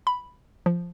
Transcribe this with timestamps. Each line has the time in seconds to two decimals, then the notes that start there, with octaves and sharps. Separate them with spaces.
0.07 B5
0.66 F3